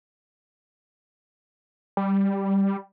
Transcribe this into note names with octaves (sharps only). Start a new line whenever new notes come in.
G3